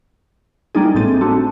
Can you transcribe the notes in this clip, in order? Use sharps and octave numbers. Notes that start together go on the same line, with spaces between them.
G3 A#3 D4 D#4 G#4
G#1 A2 C4 A6 D#7
A3 C4 D4 F#4